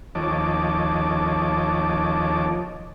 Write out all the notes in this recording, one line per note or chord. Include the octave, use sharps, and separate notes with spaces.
D#2 F3 C#5 D#5 A5 D6